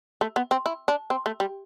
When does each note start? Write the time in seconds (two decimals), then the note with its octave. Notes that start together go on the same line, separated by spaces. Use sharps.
0.21 A3
0.36 B3
0.51 C4
0.66 E4
0.88 D4
1.10 C4
1.26 A3
1.40 G3